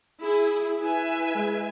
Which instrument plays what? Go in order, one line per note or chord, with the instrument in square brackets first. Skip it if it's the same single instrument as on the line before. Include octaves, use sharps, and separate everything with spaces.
[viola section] E4 G#4
[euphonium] E4 [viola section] B4 E5 G#5
[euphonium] G#3